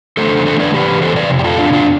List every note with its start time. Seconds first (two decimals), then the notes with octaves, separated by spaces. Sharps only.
0.17 E2 D3 A3 A4 C5
0.46 A4 C5
0.60 B4 D5
0.73 C3 E3 G4 B4
1.02 A4 C5
1.16 B4 D5
1.30 F2 C3
1.39 G4
1.44 F4 A4
1.58 D4 F4
1.73 D4 F4